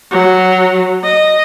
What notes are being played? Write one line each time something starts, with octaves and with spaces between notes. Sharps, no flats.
F#3
D#5